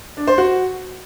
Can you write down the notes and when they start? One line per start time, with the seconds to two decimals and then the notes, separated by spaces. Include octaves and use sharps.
0.17 D4
0.27 C5
0.38 F#4